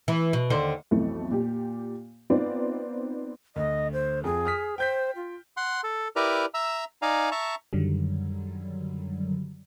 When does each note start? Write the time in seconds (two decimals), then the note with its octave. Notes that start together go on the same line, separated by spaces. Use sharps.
0.08 E3
0.33 B2
0.50 D#2 D3 C5
0.91 B1 F2 E3 A3
1.31 A#2 G4
2.30 B3 C4 D#4 F4 D5
3.56 D2 D#5
3.93 C5
4.24 F2 G#4
4.45 D#6 F6 B6
4.78 C5 G5 G6 B6
5.16 F4
5.57 F#5 C6
5.84 A4
6.16 E4 G4 A#4 B4 D5 A#5
6.54 E5 A#5 E6
7.02 D#4 D5 F5 G#5 A#5
7.31 E5 A5 A#5 C#6
7.73 F#2 D3 D#3 F#3 G3